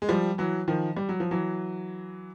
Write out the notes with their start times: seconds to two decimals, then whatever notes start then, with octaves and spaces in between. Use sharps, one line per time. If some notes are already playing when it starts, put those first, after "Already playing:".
0.02 G#3
0.09 F3 G3
0.38 E3 F#3
0.68 D#3 F3
0.97 G3
1.09 F#3
1.20 F3
1.31 E3 F#3